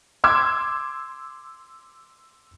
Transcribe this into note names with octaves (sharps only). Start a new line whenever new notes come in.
C6 D6 E6 G#6